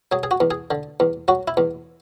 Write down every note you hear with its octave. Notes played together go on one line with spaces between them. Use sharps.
F#3 G#4
G#4
F#4
E2
G#4
D3
E2
F#3 F#4
E4
E2